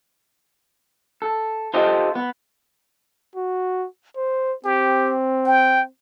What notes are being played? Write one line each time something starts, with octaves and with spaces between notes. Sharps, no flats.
A4
F4 G4 A4 C5 D#5
B3
F#4
C5
C4 G4
G5